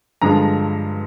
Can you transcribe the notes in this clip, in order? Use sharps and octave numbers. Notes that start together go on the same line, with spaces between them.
G2 D3 F3 G#3 A#5